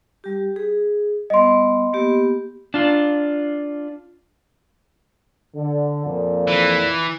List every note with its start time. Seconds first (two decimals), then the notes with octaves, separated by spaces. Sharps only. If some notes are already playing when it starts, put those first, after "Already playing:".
0.24 G3 G4
0.56 G#4
1.30 G3 B3 D#5 C6
1.93 A#3 B3 G4
2.74 D4 F4
5.55 D3
6.06 F2 A#2
6.47 E3